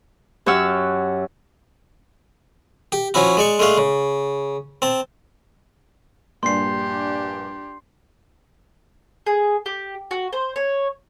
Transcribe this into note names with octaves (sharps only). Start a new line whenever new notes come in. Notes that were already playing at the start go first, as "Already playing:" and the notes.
F#2 G4 C#5 F#5 E6 F6
G4
F3 C#4 E4 F#4
G#3 D5 C#6
G#3 A3 D4 F5
C#3
C4 A5
A#1 G2 D4 G4 C6 C7
G#4
G4
F#4
C5
C#5